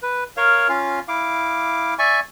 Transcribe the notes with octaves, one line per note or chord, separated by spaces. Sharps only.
B4
A#4 C#5 F5
C#4 F4 F5
E4 F5 D6
D5 E5 G#5 C#6